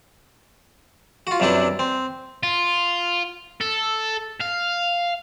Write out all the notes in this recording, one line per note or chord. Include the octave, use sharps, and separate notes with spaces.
F4 F#4
F#2 C3 G3 D4 E4 B4
C4
F4
A4
F5